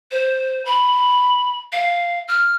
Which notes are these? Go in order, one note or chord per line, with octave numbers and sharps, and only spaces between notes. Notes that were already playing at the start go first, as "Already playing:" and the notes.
C5
B5
F5
F6